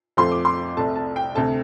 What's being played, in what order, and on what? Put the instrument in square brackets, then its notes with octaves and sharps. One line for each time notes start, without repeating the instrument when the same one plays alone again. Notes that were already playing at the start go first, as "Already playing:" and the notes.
[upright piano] F2 F3 A3 C6
D6
C6
C2 C3 A3 A5
A5
G5
D2 C3 A3 A5